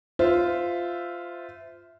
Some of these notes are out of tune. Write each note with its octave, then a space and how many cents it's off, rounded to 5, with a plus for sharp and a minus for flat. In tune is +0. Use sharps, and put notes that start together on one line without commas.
F4 +0 C5 -25 E5 +0